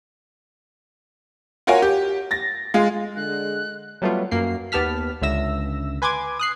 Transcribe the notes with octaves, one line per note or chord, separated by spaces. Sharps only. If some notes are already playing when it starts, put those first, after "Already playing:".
F4 F#4 A#4 C#5 G#5
G4
A6 A#6
G#3 F4
D3 G#3 F#6
F#3 G3 A3 B3 F4
F#2 A#3 C7
D#2 B3 G4 A5 F6 B6
C#2 D3 E5 E6 A#6
B4 G#5 C6 D6 G#6
D#6 F#6 C7